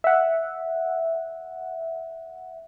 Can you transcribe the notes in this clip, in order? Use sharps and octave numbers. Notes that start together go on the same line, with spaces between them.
E5 F#5